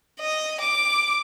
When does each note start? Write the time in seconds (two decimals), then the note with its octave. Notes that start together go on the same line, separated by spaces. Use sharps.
0.20 D#5
0.60 D6